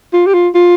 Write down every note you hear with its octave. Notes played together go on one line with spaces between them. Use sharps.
F4
G4
F4
F4